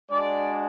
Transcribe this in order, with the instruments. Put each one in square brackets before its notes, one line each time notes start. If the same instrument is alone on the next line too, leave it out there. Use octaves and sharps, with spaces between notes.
[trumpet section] G#3 D4 F#4 D5